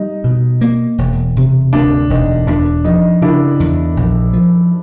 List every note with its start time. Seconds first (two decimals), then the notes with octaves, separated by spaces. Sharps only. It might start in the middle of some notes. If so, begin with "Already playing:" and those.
Already playing: G3 D#4
0.24 B2
0.61 A#3
0.98 E1
1.37 C3
1.73 D2 D4
2.10 E1 D#4
2.47 E2 D4
2.84 F3 D#4
3.22 C#3 D4 E4
3.60 E2
3.97 A#1
4.33 F3